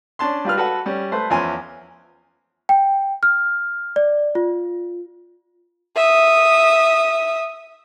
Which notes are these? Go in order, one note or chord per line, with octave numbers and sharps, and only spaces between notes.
C#4 D4 A5 C6
G3 F4 B4 F6
F#4 A4 B4 F#5
G3 C#4
A3 B4 C5
E2 F3 C#4 E4 G#5 C6
G5
F6
D5
F4
E5 D#6